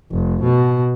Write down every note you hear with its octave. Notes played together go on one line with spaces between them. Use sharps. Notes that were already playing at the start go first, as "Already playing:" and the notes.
F1
B2